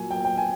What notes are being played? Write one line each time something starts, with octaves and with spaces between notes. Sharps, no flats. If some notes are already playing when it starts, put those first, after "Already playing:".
Already playing: A#2 F#3 G#5
G5
G5
G#5